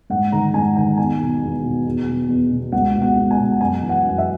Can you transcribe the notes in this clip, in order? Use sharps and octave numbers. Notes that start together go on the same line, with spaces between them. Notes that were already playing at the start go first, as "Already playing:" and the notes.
G#2 F#5
D#3 A#5
G#2 G#5
D#3 G#5
E2 G#5
B2
E2
B2
E2
B2
E2
B2
C#2 F#5
B2
F#5
C#2
G#5
B2
F#2 G#5
E3
F#5
F#2
E5